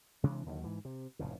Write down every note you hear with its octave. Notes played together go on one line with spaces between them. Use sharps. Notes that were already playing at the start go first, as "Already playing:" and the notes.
C3 E3 G#3 D4
D#2 D3 D#3 F#3
G#2 E3
C3
F1 A2 C#3